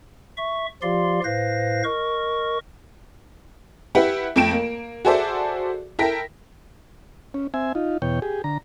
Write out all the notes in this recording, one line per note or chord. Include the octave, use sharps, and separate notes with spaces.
E5 C#6
F3 F4 G4 D5 F5 C6
A2 B4 C5 F5 A#6
A#4 D#5 C#6
E4 G4 B4 E5 F#5
F2 A3 G5 D7 E7
A#3
F#4 G#4 A4 C5 D5 E5
E4 A4 A#4 G5 A#6 B6
C#4
C4 E5 G#5
D#4 F4
E2 B2 C#5 G5
G4 G#4
D3 A#5